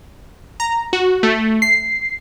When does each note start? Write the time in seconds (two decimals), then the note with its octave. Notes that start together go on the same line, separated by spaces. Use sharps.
0.60 A#5
0.93 F#4
1.23 A3
1.62 C7